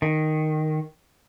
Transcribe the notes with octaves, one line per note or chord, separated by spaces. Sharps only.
D#3